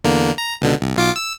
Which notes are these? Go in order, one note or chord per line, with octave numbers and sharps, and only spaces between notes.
E2 D3 A#3
A#5
C#2 B2 D3
C2
B1 F4 D6
E6